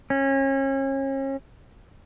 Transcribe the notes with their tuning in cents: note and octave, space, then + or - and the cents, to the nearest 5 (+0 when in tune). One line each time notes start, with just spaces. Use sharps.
C#4 -35